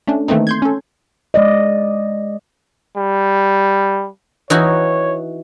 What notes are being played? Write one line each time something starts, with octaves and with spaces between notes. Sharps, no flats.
A3 C#4 D4
D#3 E3 A3 A#3 C4 D#4
C6 G6 G#6
C#4 A4
G#3 D5 D#5
G3
E3 D#4 F#4 C#5